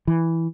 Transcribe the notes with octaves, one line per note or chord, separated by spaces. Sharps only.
E3